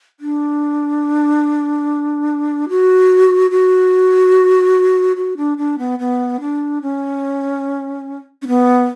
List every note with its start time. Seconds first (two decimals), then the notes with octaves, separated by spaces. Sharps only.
0.20 D4
2.69 F#4
3.51 F#4
5.17 F#4
5.37 D4
5.58 D4
5.79 B3
5.99 B3
6.40 D4
6.82 C#4
8.42 C#4
8.48 B3